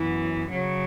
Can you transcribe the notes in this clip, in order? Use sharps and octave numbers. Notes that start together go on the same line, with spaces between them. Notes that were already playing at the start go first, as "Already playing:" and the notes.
Already playing: F#2 E3 B3
C#3 F#3 C#4